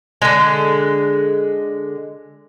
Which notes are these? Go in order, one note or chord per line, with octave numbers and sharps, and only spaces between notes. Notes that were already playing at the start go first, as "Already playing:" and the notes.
D3 G#3